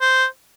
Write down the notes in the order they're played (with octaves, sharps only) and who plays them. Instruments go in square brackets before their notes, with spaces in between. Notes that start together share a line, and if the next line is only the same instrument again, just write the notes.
[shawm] C5